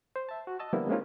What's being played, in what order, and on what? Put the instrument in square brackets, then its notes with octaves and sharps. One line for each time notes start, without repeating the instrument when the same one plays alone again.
[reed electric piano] C5
E5 A5
F#4
D#5 A5 E6
D3 F3 G3 A#3 B3 E4
G#3 A#3 C4 C#4 D#4 F4